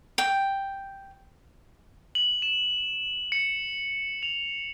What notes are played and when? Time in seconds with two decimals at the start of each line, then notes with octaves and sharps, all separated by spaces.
0.18 G5
2.15 F#7
2.42 E7
3.32 C#7
4.23 F7